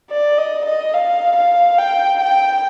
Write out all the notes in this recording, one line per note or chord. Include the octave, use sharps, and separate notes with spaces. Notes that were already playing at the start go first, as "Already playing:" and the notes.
D5
D#5
D#5
F5
F5
G5
G5